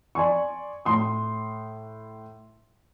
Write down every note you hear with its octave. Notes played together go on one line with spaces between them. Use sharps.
D5 G#5 C6 C#6
A2 C6 D#6